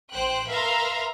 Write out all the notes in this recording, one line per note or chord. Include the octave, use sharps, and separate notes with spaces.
A1 C5 G5 F#6
A#4 B4 E5 F5 A#5 C6